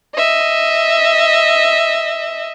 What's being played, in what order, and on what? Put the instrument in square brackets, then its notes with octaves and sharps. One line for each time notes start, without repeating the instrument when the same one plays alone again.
[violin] D#5 E5